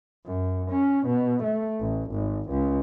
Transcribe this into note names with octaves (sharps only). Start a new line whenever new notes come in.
F#2
C#4
B2
A3
A1
G#1
C#2